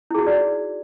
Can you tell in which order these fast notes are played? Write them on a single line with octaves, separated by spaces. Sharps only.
E4 G#4 F#4 D#4 D5